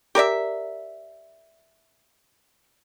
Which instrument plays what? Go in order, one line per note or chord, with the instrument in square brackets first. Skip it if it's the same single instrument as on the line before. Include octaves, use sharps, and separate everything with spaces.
[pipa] G4 A#4 D5 E5